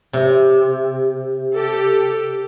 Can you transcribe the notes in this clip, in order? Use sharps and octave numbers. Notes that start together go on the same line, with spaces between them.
C3
G4 A4